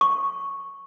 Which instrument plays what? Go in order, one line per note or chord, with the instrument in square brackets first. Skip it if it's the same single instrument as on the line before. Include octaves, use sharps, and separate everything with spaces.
[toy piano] C#6